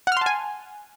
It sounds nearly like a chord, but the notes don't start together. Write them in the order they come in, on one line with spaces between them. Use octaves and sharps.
F#5 F6 C6 A5 G#5